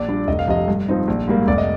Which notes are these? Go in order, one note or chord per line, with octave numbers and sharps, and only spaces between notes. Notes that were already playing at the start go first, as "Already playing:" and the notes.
Already playing: A#1 D5
A#2 G3 D4
F1 D#5
F5
F2 C3 D#5
G2
F3 C4 D#4
A#1
G#2 G3 A#3
F1 D5
D#5